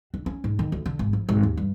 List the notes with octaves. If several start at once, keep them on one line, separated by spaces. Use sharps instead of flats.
D4
C#4
G#2
D#3
D2
D3
G#1
F3
G#1
D#2
G2